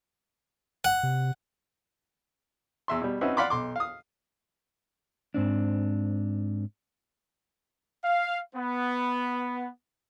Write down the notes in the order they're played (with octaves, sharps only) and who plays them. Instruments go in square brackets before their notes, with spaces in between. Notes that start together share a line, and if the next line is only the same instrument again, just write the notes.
[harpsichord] F#5
[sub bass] C3
[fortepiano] E2 E5 C6
B2 G3
C4 C#4 D#4 F#4 B4 E5
D5 F5 F#5 B5 C6 D6
B1 C6 D6
F5 D#6
[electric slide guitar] G#2 C4 D4
[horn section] F5
B3